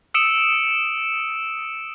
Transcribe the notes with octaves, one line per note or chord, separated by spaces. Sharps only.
D#6 E6 C#7 D7 E7